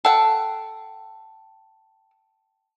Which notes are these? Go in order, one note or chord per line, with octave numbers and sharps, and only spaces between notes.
A4 F#5 G5 A5